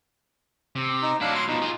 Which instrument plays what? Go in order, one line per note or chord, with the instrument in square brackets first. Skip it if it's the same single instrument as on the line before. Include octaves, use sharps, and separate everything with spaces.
[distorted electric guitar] C3
[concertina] D#4
[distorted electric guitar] F#3 E4 [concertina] D4 F5
[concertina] C6 F6
[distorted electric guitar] B2 F3 [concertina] D#4
[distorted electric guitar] F4 G#4